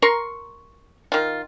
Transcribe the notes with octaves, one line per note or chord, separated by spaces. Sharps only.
A#4 A#5 C6 C#6
D#3 F4